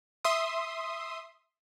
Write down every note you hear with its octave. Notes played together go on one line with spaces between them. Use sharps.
E5 C6 D#6